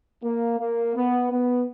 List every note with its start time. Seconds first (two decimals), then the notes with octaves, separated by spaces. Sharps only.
0.23 A#3
0.59 A#3
0.96 B3
1.31 B3